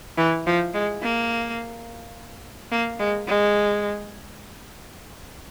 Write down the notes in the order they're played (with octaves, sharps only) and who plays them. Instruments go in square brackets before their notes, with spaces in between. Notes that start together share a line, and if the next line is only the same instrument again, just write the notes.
[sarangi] E3
F3
G#3
A#3
A#3
G#3
G#3